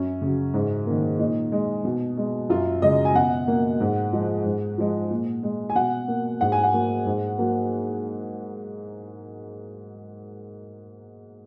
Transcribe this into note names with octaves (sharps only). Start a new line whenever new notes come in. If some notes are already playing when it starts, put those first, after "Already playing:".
Already playing: F#2 C#4
C#3 F#3
G#2
D#3 A#3
A#2 D#4
G#3
B2
G#3
F#2 F4
C#3 G#3 D#5
G#5
B2 F#5
A#3
G#2
F3 G#3
G#2
F3 G#3
A#2
G#3
G#5
B2 F#5
A#3
G#2 F#5
G#5
F#5
F#3 A#3
G#2
F#3 A#3